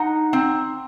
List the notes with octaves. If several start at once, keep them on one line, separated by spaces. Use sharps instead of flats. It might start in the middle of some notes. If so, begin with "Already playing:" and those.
Already playing: D#4 F#5
C4